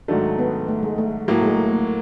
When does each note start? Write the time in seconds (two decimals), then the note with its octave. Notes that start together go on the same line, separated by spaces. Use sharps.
0.08 G#2 D#3 F#3 A3 D4
0.38 B3
0.68 A3
0.83 G#3
0.98 A3
1.28 A2 F#3 A3 A#3
1.42 G#3
1.57 A3
1.73 A#3